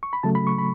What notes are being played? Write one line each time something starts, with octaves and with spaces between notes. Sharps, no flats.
C#6
B5
C#3 F#3 A3 A5
B5
C#6
B5